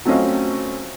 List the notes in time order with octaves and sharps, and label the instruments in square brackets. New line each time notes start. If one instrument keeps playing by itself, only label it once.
[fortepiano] F#3 A3 C4 C#4 D#5 F5